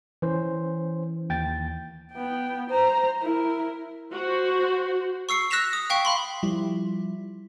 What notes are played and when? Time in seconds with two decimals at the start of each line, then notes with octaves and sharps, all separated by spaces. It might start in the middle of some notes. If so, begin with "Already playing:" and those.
0.22 E3 C#4 C5
1.29 D#2 G5 A6
2.13 B3 G5
2.70 C5 A#5
3.21 E4 A#4
4.13 F#4 C5
5.29 C#6 E6 C7 C#7
5.50 E6 F#6 A#6 B6 E7 F7
5.73 D#6
5.90 F5 G5 C#6 B6
6.05 F5 B5 C6
6.43 F3 G3 E4